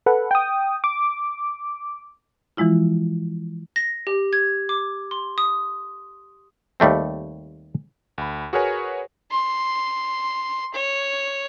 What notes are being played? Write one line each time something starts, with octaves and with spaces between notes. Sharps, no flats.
A4 B4 F#5
G5 D#6
D6
E3 F3 G#3 E4 F4
A#6
G4
G#6
D6
C6
D#6
D#2 G3 A3 C4
D2 B5
F#4 G#4 A#4 B4 C#5 G#5
C6
C#5